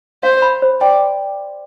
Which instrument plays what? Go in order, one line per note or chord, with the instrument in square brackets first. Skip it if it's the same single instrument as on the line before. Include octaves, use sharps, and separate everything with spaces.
[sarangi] C5 [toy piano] F5
[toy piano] B5
C5
[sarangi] D5 [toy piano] G5